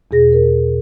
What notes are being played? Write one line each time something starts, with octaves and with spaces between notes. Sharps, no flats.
E2 B2 G#4 A#6
A#4